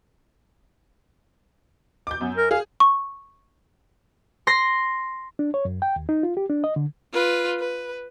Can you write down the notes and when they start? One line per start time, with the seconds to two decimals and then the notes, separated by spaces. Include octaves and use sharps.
2.07 D6 G6
2.21 F#2 B3
2.36 A#4
2.51 G#4 F5
2.80 C#6
4.47 C6 A#6 C7
5.39 D4
5.54 C#5
5.65 F#2
5.82 G5
5.96 D#2
6.09 D#4
6.23 F4
6.37 G4
6.50 D4
6.64 D#5
6.76 D3
7.13 F4 B4
7.60 B4